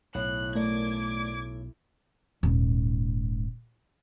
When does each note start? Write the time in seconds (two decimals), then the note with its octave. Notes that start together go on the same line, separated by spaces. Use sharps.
0.15 B1 A2 F#6
0.55 A3 A#4 D5 D6 G#6
2.43 D#1 G#2